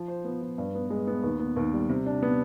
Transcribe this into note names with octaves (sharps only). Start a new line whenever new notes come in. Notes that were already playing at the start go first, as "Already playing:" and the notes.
Already playing: F3
C5
B3
F3
G2
B3
G#3
B3
D#2
B3
D#2
G3
C3
D4
B3